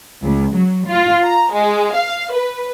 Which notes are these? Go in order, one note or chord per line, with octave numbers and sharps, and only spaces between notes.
C#2
F#3
F4
A#5
G#3
F5
B4